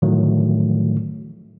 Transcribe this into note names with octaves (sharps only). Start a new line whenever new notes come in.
A2 D3 D#3 F3 F#3 A3